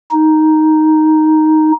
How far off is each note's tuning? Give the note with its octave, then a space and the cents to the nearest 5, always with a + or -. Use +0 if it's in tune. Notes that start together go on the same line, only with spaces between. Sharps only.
D#4 +5